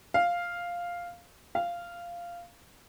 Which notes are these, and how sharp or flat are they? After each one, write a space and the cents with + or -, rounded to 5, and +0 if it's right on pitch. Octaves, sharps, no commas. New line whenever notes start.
F5 +0
F5 -10